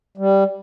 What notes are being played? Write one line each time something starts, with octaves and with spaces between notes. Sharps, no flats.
G3